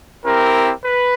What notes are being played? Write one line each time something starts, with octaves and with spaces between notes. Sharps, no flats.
C4 E4 G4 A#4
B4